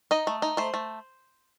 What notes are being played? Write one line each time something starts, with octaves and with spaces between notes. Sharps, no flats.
D#4 D#5
A3
D#4
A3 C5
A3